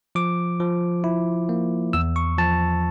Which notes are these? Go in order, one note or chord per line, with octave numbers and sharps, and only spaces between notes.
F3 D6
F3
E4
A#3
E2 E6
C#6
F3 A5